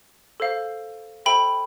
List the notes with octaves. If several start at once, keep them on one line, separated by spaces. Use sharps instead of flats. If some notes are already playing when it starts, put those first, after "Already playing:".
A4 C5 F5
A4 C5 E5 G5 B5